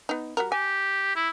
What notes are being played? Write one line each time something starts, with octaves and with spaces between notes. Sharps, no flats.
B3 D#4
G3 F#4 A#4
G4 G#5
E4